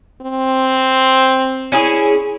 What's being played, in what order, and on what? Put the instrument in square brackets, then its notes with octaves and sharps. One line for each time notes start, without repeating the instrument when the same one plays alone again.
[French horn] C4
[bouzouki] C#4 E4 G#4